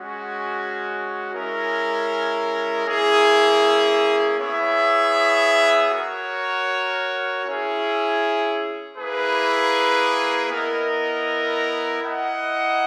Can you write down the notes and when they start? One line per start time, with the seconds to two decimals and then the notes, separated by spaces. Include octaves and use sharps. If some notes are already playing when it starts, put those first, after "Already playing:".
Already playing: G#3 C#4 F#4
1.34 G#3 C#4 E4 A#4
2.86 A#3 C#4 E4 G#4
4.38 B3 E4 G#4 C#5 E5
5.91 F#4 A#4 C#5
7.44 C#4 E4 G#4
8.97 A#3 E4 G#4 B4
10.49 B3 E4 A#4 D#5
12.03 E4 A#4 D#5 F#5